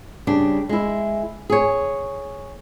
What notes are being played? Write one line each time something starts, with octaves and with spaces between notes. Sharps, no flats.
C#3 G3 D4
G#3 E4
G#4 C#5